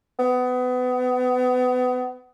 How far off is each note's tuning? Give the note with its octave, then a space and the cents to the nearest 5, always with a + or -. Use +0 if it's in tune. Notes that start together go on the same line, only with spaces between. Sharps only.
B3 +30